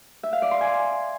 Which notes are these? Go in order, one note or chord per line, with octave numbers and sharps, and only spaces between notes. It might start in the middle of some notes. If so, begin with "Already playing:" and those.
E5
F5
D5
C6
G#5